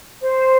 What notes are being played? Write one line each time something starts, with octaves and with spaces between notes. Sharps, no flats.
C5